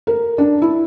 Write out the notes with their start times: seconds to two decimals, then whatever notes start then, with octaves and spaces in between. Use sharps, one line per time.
0.07 A#4
0.38 D4
0.62 E4